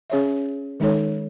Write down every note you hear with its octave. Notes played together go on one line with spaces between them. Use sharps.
C#4 G#4 C#5 E5
D#3 G#3 D#4 A4 C#5